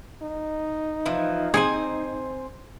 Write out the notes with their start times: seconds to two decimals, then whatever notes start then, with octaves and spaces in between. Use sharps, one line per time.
0.22 D#4
1.06 E3 F3
1.54 C4 G#4 C5 G#5